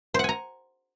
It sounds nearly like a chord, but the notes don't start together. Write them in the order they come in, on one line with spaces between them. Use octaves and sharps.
C5 F#5 G#5 A#5